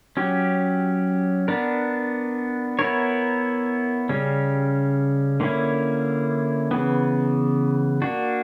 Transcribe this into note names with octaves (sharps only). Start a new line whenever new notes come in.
F#3 C#4 G4
B3 D4 A#4
B3 E4 A#4 C#5
C#3 G3 C#4
D3 A#3 C#4 E4
C#3 E3 B3
A#3 D4 F#4